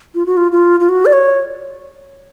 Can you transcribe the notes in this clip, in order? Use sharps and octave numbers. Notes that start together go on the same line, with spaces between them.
F4
F#4
F4
F4
F4
F#4
D5
C#5